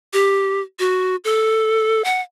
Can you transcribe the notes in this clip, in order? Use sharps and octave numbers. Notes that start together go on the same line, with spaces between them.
G4
F#4
A4
F#5